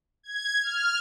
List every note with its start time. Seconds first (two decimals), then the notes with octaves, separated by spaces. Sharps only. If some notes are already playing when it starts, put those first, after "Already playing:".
0.23 G#6
0.62 F6